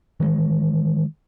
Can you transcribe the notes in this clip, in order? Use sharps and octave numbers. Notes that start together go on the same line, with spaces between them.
D#3 E3 G#3